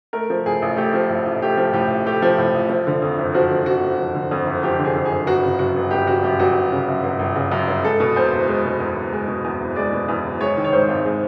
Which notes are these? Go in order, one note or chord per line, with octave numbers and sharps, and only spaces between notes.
A3 A#4
F3
A2 G#4
A1
A3 G4
F3
A2
A1
A3 G4
F3
A2 G4
A1
A3 G4
F3
A2
A1
F3
D3
F2
F#1
F3 F#4
D3
F2 F#4
F#1
F3
D3
F2
F#1
F3 G4
D3
G#4
F2
G#4
F#1
G1 F#4
C#3
F#2 F#4
G1
G1 G4
C#3 F#4
F#2 G4
G1 F#4
G1
C#3
F#2
G1
G1
C#3
F#2
G1
G#3 A4
B2
E2 C5
F#1
G#3
B2
E2
F#1
G#3
B2
E2
F#1
G#3 D5
B2
E2
F#1
G#3 C#5
D#3
C#5
G#2 C5
G#1
G#3